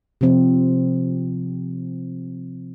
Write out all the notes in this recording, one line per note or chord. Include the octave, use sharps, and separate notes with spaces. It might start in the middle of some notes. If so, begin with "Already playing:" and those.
C3 F3 C4